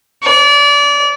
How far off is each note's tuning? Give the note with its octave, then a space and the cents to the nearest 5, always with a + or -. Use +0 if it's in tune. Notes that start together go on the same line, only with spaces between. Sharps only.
D5 -30